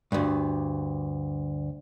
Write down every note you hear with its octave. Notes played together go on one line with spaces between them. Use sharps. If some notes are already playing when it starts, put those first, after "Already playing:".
D2 G2